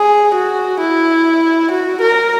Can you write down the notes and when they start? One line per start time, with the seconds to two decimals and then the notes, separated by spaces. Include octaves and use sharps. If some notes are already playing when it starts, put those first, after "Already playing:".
Already playing: G#4
0.35 F#4
0.81 E4
1.72 F#4
2.02 A#4